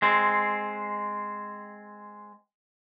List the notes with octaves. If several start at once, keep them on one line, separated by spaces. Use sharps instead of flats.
G#3 C4